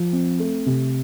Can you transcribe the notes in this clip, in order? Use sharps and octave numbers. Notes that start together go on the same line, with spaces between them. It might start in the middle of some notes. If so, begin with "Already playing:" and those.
Already playing: F3
C4
A3
C3